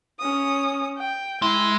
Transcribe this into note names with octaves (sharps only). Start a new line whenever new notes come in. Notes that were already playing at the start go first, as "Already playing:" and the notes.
C#4 D#6
G5
G#3 E4